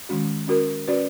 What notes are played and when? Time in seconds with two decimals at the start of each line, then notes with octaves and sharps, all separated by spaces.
0.09 D#3 G#3 C#4 F#4
0.48 C#4 F#4 A#4
0.88 C#4 F#4 B4 D5